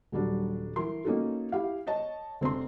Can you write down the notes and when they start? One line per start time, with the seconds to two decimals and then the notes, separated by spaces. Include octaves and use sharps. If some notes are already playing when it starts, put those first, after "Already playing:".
0.12 D#1 F#3 G3 D4
0.76 E3 A#4 C6
1.05 A#3 C#4 D#4 F#4 A4
1.52 E4 G4 F5
1.87 C#5 D#5 A5
2.41 F1 C4 D4 C6